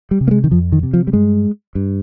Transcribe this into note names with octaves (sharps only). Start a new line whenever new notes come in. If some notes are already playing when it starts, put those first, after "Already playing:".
G3
C3
A#3
G#3
D#3
F2 F3
D#3
C3
F3
G3
G2 G#3
G2